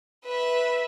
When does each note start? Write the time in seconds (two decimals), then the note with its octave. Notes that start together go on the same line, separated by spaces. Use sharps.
0.25 B4 E5